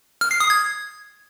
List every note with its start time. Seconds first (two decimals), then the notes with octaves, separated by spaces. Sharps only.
0.21 F6
0.31 C7
0.40 D#6
0.50 G#6